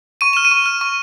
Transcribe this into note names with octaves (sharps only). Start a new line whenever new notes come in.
C#6 D#7
F6 E7
D#7
C#6
F6
C#6